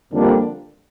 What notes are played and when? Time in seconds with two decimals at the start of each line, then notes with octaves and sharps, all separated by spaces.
0.12 F2 D3 G3 A#3 D4